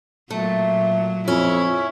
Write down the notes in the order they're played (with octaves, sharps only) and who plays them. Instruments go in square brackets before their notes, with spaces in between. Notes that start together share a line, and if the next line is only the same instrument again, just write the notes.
[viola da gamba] A#2 F#3 [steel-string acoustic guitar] A3
[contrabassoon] F2 [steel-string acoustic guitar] C#4 [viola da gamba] E4